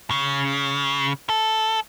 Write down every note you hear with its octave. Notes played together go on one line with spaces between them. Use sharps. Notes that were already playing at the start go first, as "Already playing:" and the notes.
C#3
A4